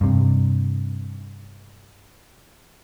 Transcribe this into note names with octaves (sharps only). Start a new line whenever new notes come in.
G2 C3